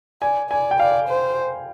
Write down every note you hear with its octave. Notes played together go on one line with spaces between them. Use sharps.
D5 G#5
D5 G#5
G5
D5 F5
C5